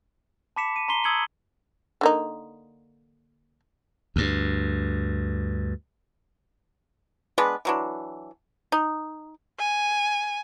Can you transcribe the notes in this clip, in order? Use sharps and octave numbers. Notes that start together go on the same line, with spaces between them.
A5 B5 D6 B6 C#7 E7
D#7
A#5 C6 B6 C7 G7
D#6 E6 G#6 C#7 F#7 G7
D3 A#3 D#4
D2 G2
G#3 B3 D4 B4
E3 F#3 D4
D#4
G#5